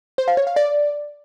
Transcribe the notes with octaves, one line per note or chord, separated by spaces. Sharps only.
C5
F5
C#5
F5
D5